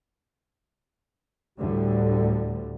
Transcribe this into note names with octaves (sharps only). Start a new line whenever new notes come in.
D2 A2 D3 G3